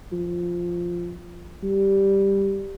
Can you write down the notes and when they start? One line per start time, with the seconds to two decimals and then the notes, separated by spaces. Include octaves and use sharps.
0.12 F3
1.63 G3